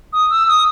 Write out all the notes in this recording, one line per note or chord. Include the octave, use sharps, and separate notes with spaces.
D#6
E6
D#6